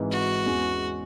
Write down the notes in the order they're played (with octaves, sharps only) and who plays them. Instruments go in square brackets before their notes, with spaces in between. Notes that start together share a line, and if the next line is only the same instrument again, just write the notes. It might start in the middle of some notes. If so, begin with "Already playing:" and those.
Already playing: [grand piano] G#1 G#2 E3
[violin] F#4
[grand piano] E2 E3 G#3 C#4